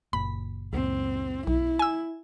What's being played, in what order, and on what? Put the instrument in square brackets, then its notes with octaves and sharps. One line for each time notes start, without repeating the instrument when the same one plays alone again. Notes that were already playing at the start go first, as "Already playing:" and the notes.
[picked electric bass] F#1 A#2 [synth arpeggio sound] B5
[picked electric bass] C#2 F#2 A#2 [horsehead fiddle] C4
[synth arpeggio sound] B1 [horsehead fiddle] E4
[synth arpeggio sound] G#5 E6